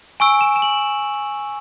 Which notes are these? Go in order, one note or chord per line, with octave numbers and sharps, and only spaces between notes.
G#5 C#6 E6 D7
E7
E7
F#7